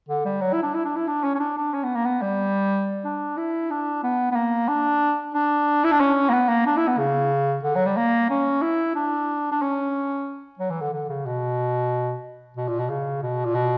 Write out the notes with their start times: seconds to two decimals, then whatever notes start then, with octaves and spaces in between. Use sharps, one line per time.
0.09 D3
0.25 G3
0.41 F#3
0.53 E4
0.63 D4
0.74 E4
0.85 D4
0.96 E4
1.08 D4
1.24 C#4
1.35 C#4
1.39 D4
1.57 D4
1.74 C#4
1.83 B3
1.95 A#3
2.05 B3
2.22 G3
3.05 D4
3.37 E4
3.70 D4
4.03 B3
4.32 B3
4.35 A#3
4.68 D4
5.34 D4
5.84 E4
5.91 D4
6.00 C#4
6.29 A#3
6.33 B3
6.48 A#3
6.66 D4
6.77 E4
6.88 B3
6.98 C#3
7.63 D3
7.75 F#3
7.86 G3
7.97 A#3
8.30 C#4
8.62 E4
8.95 D4
9.52 D4
9.62 C#4
10.59 F#3
10.70 E3
10.81 D3
10.93 D3
11.09 C#3
11.26 B2
12.57 B2
12.68 A#2
12.79 B2
12.90 C#3
13.23 B2
13.45 A#2
13.55 B2